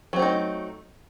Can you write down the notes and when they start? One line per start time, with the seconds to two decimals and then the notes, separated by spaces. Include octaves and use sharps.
0.13 F#3
0.16 C4
0.19 A3
0.22 D#4